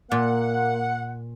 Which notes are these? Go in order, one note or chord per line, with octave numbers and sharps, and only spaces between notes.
A#2 A#3 F#5